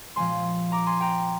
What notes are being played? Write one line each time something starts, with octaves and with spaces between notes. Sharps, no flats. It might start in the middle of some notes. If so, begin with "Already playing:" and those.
A#2 F3 G#3 C4 G#5 C6
A#5 D6
G#5 C6
G5 A#5